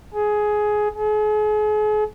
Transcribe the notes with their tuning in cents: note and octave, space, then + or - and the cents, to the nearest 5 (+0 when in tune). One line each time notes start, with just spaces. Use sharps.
G#4 +15
G#4 +40